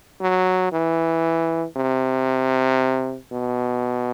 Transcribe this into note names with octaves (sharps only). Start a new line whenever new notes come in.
F#3
E3
C3
B2